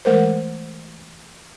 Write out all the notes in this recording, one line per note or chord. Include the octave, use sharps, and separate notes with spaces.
E3 G#3 A3 A#4 C5